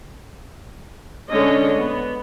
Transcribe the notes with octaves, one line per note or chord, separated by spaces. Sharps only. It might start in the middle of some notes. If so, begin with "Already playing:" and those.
D3 G#3 C#4 C#5 D#5
B3